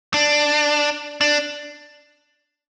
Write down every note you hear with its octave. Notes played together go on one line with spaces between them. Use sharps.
D4
D4